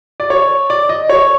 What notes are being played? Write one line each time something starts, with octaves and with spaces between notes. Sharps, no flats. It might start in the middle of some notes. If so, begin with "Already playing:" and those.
D5
C#5
D5
D#5
C#5